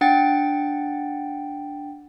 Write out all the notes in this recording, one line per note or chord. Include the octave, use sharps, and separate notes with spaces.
D4 F#5 G5 A6